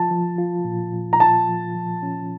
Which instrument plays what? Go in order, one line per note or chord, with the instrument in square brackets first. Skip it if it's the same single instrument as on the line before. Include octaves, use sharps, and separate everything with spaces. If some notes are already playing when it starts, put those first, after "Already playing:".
Already playing: [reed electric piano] F3 F4 [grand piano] A5
[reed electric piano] F3
F4
A#2
A#2
[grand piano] A#5
[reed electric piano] F4 [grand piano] A5
[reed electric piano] F3
F3
C#4